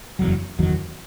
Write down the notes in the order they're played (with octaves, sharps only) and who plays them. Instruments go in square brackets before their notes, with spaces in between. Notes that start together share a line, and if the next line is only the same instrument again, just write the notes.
[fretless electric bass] F#1 E2 D#3 F#3
F#1 E2 D#3 F#3